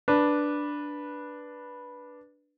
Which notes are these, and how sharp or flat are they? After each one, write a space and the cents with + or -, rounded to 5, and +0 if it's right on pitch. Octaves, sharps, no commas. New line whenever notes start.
D4 +0 B4 -10